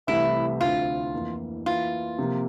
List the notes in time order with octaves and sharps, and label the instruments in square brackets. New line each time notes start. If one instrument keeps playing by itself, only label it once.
[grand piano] C2 C3 E3 A3 [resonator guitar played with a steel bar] E4
[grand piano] D2 D3 A3 C4 [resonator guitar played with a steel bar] F4
[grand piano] F2 E3 A#3 E4
[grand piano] E3 A#3 E4 [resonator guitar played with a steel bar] F4
[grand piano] C3 F3 A#3